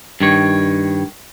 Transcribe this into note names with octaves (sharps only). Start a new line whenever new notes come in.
G2 D#3 C#5